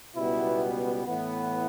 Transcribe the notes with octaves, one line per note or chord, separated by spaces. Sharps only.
C#2 B2 G3 B3 E4
A2 E3 B3